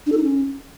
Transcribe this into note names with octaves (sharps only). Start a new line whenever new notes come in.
D4
A4
D#4
C#4